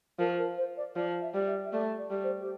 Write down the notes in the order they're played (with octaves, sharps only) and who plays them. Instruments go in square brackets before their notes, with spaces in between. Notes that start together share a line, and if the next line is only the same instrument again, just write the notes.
[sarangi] F3 [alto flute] A#4
[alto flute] A#4
C5
D5
[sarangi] F3 [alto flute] D5
[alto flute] E5
[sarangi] G3
[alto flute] E5
E5
[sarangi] A3 [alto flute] D5
[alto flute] D5
[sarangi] G3
[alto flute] C5
G4